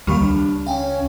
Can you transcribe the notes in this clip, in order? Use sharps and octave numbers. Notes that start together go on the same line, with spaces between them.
D#2 D#3 G3 A#3 G4 B5 C#6
C#2 D4
C#4 F5 G5 G#5